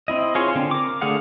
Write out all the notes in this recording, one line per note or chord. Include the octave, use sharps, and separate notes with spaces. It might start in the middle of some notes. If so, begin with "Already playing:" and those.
C4 E4 D#5
F4 G#4 C5 C#5 G#5
D3 C4
A#4 D6
D3 A3 G#4 F5 F#5